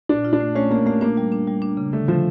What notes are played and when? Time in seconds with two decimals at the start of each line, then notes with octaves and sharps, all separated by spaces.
0.09 A#2 D4
0.25 F4
0.33 D4
0.40 A3
0.55 A3 C#4
0.70 A3 A#3
0.86 A3 A#3
1.01 A#3 D4
1.17 G3
1.32 D4
1.47 G3
1.62 D4
1.77 C#3
1.92 D3 A3
2.08 D3 F3